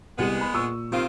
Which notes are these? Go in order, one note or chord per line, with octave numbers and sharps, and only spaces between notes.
C2 G#3 B3 G4 D#7
B5
A#2 C#6 E6
C3 D#3 C4 F4